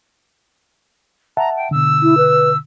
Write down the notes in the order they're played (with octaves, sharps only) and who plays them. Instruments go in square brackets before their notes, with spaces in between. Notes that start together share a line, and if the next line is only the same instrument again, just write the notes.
[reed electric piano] E5 F#5 A5 [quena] A#5
[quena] G5
[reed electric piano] B2 D3 [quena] E6
[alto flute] E4
B4